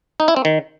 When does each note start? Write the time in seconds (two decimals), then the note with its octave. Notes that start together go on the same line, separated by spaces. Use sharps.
0.20 D#4
0.28 E4
0.36 C4
0.45 D#3